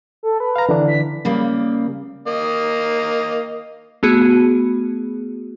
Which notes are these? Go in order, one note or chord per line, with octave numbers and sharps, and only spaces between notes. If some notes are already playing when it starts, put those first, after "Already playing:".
A4
B4
F5 A#5
D3 E3 D4
B6
C#3 G3 A#3
A#3 D#5
A3 B3 F#4 G#4